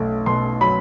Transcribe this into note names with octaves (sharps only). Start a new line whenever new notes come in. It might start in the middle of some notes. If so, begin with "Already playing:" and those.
Already playing: B1 A3
B2 C6
F#3 B5